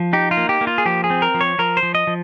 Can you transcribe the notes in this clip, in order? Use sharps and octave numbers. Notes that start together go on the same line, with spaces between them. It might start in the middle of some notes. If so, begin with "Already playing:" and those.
Already playing: F3
D#4 G4
F4
A#3
G4
A#3
F4
G#4
F3 G4
G#4
C4
A#4
F3
C#5
F3 A#4
C5
F3
D#5
F3